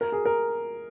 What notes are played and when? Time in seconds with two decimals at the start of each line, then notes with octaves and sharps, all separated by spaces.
0.01 A#4
0.12 G#4
0.25 A#4